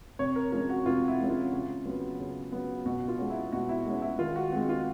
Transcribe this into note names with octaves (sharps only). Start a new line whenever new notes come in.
C3 C#5
A#4
F3 G#3 C#4 A#4
F#4
C3 F4
E4
F3 G#3 C#4
F4
C#3
F#3 B3
C#3
F#3 B3
B2 F#4
F4
G#3 C#4
E4
B2 F#4
E4
G#3 C#4
E4
D#3 F4
F#4
G#3 C4 F#4
F4